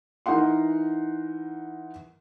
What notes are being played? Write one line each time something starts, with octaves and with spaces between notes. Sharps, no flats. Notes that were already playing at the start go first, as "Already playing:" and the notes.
E3 D#4 A#4 F#5 C6